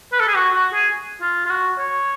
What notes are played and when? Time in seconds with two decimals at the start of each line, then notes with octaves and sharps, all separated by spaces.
0.12 B4
0.20 A4
0.28 G#4
0.35 F#4
0.54 F#4
0.73 G#4
1.21 F4
1.46 F4
1.50 F#4
1.78 C#5